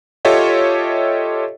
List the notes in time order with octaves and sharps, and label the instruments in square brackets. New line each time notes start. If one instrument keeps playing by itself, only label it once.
[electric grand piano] F4 G4 A4 C#5 D#5 E5